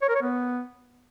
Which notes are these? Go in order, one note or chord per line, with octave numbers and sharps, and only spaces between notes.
C#5
A#4
C#5
B3